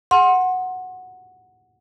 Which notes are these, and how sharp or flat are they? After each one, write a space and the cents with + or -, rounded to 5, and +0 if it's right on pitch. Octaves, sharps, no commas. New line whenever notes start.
F#5 -5 C6 +20